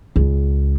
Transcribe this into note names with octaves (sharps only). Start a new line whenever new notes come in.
C#2